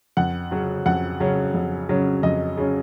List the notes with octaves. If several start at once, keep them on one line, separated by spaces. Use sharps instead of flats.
F2 F#5
C#3 F#3 C#4
F2 F#5
C#3 F#3 C#4
F2
C#3 F#3 C#4
F2 D#5
C#3 F#3 C#4